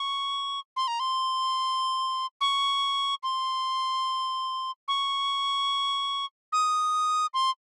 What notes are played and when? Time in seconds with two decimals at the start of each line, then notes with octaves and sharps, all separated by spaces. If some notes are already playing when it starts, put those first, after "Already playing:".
Already playing: C#6
0.76 C6
0.88 A#5
1.00 C6
2.41 C#6
3.23 C6
4.88 C#6
6.52 D#6
7.34 C6